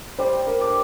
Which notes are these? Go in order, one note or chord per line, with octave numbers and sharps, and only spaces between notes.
G3 C5
A#4
D4 G4 D5